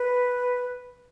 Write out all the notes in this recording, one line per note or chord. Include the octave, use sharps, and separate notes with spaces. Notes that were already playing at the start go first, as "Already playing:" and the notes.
Already playing: B4